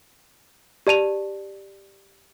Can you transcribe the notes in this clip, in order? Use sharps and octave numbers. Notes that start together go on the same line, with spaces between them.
G4 D5 A5 D#7 F7